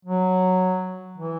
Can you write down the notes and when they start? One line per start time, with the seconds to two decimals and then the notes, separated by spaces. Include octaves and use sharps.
0.05 F#3
1.18 E3